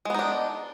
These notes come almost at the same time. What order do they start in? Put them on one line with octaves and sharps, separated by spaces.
G#3 B3 D#4 D4